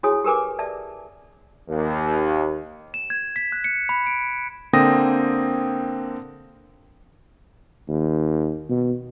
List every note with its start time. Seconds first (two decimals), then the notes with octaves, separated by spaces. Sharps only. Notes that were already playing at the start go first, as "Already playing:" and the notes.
0.03 E4 F#4 G#4 C#5 G#5 D#6
0.24 G4 A#4 B4 G#5 D6
0.59 D5 E5 A5
1.70 D#2
2.94 E7
3.10 G#6
3.36 B6
3.52 F#6
3.64 C#7
3.89 B5
4.07 D7
4.73 D3 A#3 C4 G5 D#6 A#6
7.88 D#2
8.69 B2